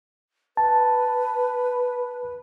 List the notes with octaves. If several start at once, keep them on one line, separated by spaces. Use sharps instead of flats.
B4 A5